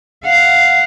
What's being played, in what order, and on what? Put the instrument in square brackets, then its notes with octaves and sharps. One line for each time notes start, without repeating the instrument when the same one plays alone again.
[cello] F5 F#5